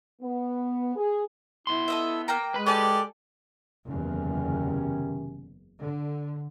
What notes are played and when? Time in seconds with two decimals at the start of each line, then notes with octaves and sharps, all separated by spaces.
0.22 B3
0.96 G#4
1.67 B3 E4 C6
1.88 A4 D#5 E5
2.28 A#3 G5 A#5
2.54 G#3 B4 B5
2.66 G4 A4 D5 G#5 A5
3.87 F#1 E2 C3 D#3 C#4
5.80 D3